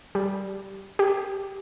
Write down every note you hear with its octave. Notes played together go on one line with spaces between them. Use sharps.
G3
G4